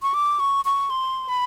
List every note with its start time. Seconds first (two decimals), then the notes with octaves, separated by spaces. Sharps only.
0.02 C#6
0.14 D6
0.40 C#6
0.65 C#6
0.90 C6
1.29 B5